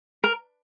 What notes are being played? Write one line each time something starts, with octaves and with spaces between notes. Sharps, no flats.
A#4